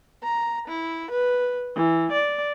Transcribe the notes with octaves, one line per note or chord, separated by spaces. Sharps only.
A#5
E4
B4
E3
D5